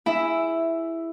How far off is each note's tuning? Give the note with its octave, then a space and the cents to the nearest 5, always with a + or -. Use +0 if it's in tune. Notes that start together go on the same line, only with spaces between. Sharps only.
E4 +5 G#4 +0 E5 +0